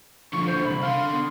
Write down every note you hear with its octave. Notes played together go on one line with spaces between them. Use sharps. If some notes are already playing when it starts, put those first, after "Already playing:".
D3 F3 C#6
E2 D3 C5
C2 B5
D3 F5 C6
B3